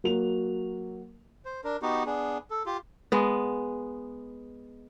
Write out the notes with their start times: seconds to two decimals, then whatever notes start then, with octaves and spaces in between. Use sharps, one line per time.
0.04 F#3 A#3 F#4 F7
1.45 C5
1.64 D4 A#4
1.82 B3 D#4 F#4 G4
2.06 B3 D4 G#4
2.50 A4
2.66 F4 G4
3.12 G#3 B3